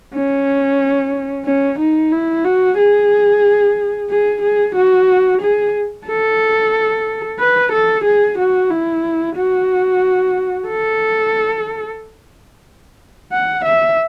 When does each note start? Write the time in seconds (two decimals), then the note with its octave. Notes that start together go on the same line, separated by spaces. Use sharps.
0.14 C#4
1.45 C#4
1.79 D#4
2.12 E4
2.45 F#4
2.78 G#4
4.10 G#4
4.42 G#4
4.76 F#4
5.42 G#4
6.07 A4
7.39 B4
7.72 A4
8.04 G#4
8.38 F#4
8.70 E4
9.36 F#4
10.68 A4
13.32 F#5
13.64 E5